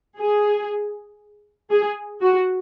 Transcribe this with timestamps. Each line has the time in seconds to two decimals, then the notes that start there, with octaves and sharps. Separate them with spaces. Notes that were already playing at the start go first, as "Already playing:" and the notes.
0.20 G#4
1.71 G#4
2.21 F#4